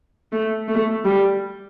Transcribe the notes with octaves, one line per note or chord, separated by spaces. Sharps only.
A3
A3
G3